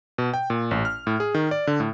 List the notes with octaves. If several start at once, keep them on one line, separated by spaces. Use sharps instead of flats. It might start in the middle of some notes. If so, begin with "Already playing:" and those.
B2
G5
A#2
A1
F6
A2
G#4
D#3
D5
D3
A2